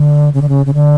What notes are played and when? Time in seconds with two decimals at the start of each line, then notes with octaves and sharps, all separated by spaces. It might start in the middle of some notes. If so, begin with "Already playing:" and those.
Already playing: D3
0.34 C#3
0.41 D3
0.49 C#3
0.66 C#3
0.74 D3